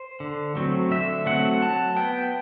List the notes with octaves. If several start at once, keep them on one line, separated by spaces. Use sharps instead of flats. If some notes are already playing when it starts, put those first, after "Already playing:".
Already playing: C5
D3
F#3 A3 C4
D3 E5
F#3 A3 C4 F#5
F#3 A5
B3 G5